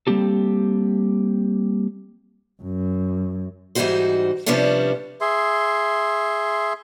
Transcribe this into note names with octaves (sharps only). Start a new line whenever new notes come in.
G3 A#3 C4 G4 A4
F#2
G#2 E3 G3 D#4 F#4 C5
C3 F3 G3 B3 C#4 D4
G#4 E5 C6